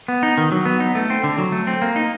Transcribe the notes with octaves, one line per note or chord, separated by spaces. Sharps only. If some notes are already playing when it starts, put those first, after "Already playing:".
B3
D#4
D#3
F#3
B3
D#4
A3
C4
D3
F#3
A3
C4
A#3
D#4